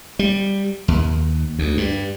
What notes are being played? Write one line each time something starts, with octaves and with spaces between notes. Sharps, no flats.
G3
D#2
D2
G2